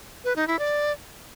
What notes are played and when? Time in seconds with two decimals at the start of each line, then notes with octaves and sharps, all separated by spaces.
0.24 B4
0.36 D#4
0.47 E4
0.59 D5